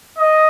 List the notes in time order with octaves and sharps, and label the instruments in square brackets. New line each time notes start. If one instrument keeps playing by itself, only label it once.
[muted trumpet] D#5